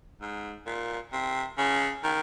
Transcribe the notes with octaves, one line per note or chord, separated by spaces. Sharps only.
G#2
A#2
C3
C#3
D#3